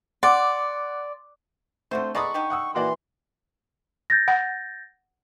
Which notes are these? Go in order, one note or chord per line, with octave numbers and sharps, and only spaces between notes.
D5 F#5 C6 D6
D3 A3 C4 F#4 C5
G#3 B3 A4 D5 A#5 C#6 D#6
D3 D#4 G4
F#5 D#6 E6
E3 A#3 F#4 D5 C6
G6 A6 A#6
F#5